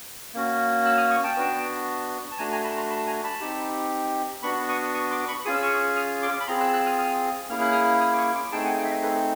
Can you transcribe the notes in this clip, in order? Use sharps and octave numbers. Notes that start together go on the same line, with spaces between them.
A#3 C#4 F#4
E6 F#6
D#6 F6
C#6 D#6
G5 A5
B3 D4 F#4
A5
A3 D4 F#4 G#5 A#5
G#5 A#5
A5 B5
A#5 C6
A5 B5
G#5 A#5
A5 B5
C4 D#4 G4
B3 D4 F#4 B5 C#6
C#6 D#6
C#6 D#6
C6 D6
B5 C#6
C#4 F4 G#4 D#6
E6
C#6 D#6
D#6 F6
C6 D6
B5
C4 F4 G#4 A#5 C6
E6 F#6
E6 F#6
D#6 F6
D#6 F6
A#3 C#4 E4 G#4 F6
F#6
D#6 F6
D#6 F6
D6
C#6 D#6
C6 D6
A3 C4 D#4 G#4 G5 A5
F#5 G#5
F5 G5
E5
D#5 F5
A4 B4